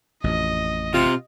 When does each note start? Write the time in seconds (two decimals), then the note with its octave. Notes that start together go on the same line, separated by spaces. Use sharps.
0.24 A1 F2 D#5
0.94 C3 C4 F4